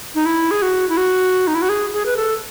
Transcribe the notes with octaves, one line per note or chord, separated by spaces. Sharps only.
D#4
E4
G#4
F#4
E4
F#4
D#4
E4
F#4
G#4
G#4
B4
A4